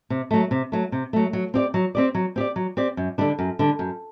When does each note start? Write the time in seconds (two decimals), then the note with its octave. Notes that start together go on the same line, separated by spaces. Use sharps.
0.10 C3
0.31 F#3 A3
0.51 C3
0.72 F#3 A3
0.92 C3
1.13 F#3 A3
1.33 F#3
1.54 C4 G4 D5
1.74 F#3
1.95 C4 G4 D5
2.15 F#3
2.36 C4 G4 D5
2.56 F#3
2.77 C4 G4 D5
2.97 F#2
3.18 D3 G3 D4
3.39 F#2
3.59 D3 G3 D4
3.79 F#2